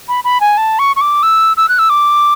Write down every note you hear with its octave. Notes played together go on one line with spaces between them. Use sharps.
B5
B5
G#5
A5
C#6
C#6
D6
E6
E6
F#6
E6
D6